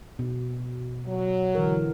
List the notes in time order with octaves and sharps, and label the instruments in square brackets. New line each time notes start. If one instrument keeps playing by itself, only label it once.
[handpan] B2
[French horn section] F#3
[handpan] D3 E3 A#4